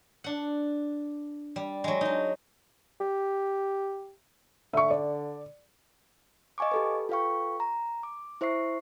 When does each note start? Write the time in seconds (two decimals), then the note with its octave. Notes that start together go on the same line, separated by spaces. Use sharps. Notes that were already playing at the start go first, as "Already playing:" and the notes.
0.24 D4 F#5
1.56 G3
1.84 F#3 G#3
2.01 D#4 A5
3.01 G4
4.73 D3 E5 C#6
4.90 D5
6.58 D#5 F5 G#5 C#6 D6
6.72 G4 A4 B4
7.09 F4 A4 B4 F5 G5 C#6
7.60 A#5
8.03 D6
8.41 E4 C5 E5 C#6 C7